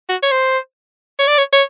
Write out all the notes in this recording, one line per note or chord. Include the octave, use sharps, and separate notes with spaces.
F#4
C#5
C5
C#5
D5
C#5
C#5